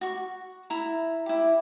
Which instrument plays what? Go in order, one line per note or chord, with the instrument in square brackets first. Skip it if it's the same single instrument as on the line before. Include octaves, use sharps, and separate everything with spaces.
[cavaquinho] F#4 C#6
E4 E5 A#5
E4 G4